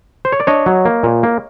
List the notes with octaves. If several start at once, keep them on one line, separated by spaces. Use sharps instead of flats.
C5
C#5
D5
D4 C#5 D#5
F#3
A#3
A#2
A#3